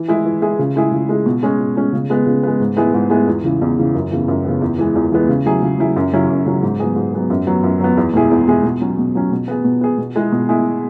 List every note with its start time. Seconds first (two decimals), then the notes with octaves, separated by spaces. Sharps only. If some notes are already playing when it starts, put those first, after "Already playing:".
Already playing: E3
0.08 G#3 E4 G#4
0.25 E3
0.42 G#3 E4 G#4
0.59 C#3
0.76 G#3 E4 G#4
0.92 C#3
1.09 G#3 E4 G#4
1.26 B2
1.43 G#3 C#4
1.59 B2
1.76 G#3 C#4
1.93 C#3
2.10 G#3 B3
2.26 C#3
2.43 G#3 B3
2.60 G#2
2.77 G#3 B3 E4 G#4
2.94 G#2
3.10 G#3 B3 E4 G#4
3.28 E2
3.44 C#3 E3
3.61 E2
3.78 C#3 E3
3.95 F#2
4.11 C#3 E3 B3
4.28 F#2
4.45 C#3 E3 B3
4.61 E2
4.78 E3 G#3 B3
4.95 E2
5.12 E3 G#3 B3
5.29 C#3
5.46 F#3 E4 G#4
5.62 C#3
5.79 F#3 E4 G#4
5.96 F#2
6.13 C#3 F#3 C#4 E4
6.29 F#2
6.46 C#3 F#3 C#4 E4
6.63 G#2
6.80 F#3 B3 G#4
6.96 G#2
7.13 F#3 B3 G#4
7.30 F#2
7.47 F#3 B3
7.63 F#2
7.80 F#3 B3
7.97 E2
8.14 B2 G#3 E4 G#4
8.31 E2
8.47 B2 G#3 E4 G#4
8.64 B2
8.81 F#3 C#4
8.98 B2
9.15 F#3 C#4
9.32 B2
9.48 B3 G#4
9.65 B2
9.81 B3 G#4
9.98 B2
10.16 G#3 E4 G#4
10.32 B2
10.49 G#3 E4 G#4